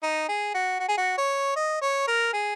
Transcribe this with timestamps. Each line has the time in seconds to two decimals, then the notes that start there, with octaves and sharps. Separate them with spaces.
0.03 D#4
0.29 G#4
0.55 F#4
0.80 F#4
0.88 G#4
0.98 F#4
1.18 C#5
1.56 D#5
1.82 C#5
2.08 A#4
2.33 G#4